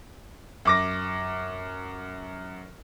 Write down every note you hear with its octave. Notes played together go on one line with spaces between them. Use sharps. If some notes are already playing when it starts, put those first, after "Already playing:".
F#2 D6 A#6